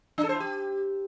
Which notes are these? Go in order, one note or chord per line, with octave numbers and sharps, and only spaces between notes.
D4
A4
C5
E4
G4